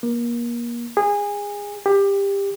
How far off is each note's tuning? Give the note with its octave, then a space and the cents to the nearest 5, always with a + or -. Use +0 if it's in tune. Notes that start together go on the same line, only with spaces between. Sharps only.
A#3 +30
G#4 -25
G4 +20